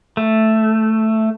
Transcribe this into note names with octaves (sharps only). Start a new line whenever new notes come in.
A3